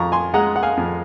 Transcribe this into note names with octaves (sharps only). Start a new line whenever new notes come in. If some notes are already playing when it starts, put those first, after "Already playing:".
Already playing: F2 A#5 C#6
G#5 C6
G#3 F#5 A#5
F#5
F5 G#5
F2